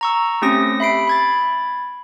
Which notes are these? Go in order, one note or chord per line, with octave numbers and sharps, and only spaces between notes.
A#5 C#6 E6
A3 C4 C#4 G4 D#6 A#6
E5 B5 C7 D7
B5 G#6 A6